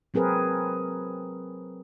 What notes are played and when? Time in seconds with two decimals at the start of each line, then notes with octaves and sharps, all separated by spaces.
0.14 F#3 C4 G#4 A#4 B4